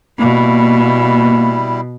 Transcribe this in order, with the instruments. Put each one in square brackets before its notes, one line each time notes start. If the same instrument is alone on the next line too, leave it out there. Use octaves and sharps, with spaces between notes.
[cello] B2 [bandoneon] G3 E4 [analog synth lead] A#3